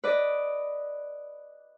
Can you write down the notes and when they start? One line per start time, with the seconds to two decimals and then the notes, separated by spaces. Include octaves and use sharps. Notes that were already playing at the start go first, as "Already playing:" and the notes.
0.04 B4 D5 D#5